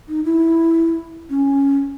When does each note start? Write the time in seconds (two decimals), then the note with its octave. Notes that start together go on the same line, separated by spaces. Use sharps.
0.09 D#4
0.25 E4
1.30 C#4